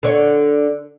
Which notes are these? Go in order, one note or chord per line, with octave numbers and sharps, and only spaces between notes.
D3 C#5